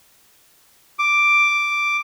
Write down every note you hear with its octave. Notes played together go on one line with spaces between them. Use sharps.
D6